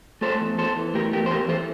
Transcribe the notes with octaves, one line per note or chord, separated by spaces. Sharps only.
A3 A4 C5
E2
E2 A4 C5
E3
A3 G4 A#4
E2 G4 A#4
C5
E2 G4 A#4
E3 A4 C5